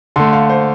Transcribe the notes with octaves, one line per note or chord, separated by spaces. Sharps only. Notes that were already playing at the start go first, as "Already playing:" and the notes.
D3 A3 C6
F5
C5